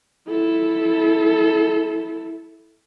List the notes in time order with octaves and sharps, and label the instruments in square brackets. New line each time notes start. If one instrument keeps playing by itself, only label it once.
[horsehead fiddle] E4 A4